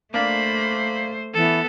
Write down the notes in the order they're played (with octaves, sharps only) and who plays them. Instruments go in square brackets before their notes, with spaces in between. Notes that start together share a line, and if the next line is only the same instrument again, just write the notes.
[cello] A3 C5 [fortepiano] A#3 D4 [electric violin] B5
[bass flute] E3 [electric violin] B3 A4